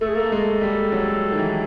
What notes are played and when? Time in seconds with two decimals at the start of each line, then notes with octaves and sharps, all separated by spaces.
0.01 A3 A4
0.09 G#4
0.15 A#3 A4
0.24 A3
0.32 G#3
0.62 G3
0.92 F#3
1.32 D#3
1.37 E3